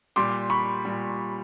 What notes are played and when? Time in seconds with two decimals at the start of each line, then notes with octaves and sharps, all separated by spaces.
0.16 A#2 G3 C6 D6
0.50 B5 C#6
0.85 A#2 G3